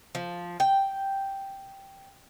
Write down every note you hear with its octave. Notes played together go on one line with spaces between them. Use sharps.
F3
G5